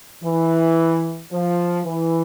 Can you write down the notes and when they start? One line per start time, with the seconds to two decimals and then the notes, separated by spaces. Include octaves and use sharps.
0.22 E3
1.31 F3
1.85 E3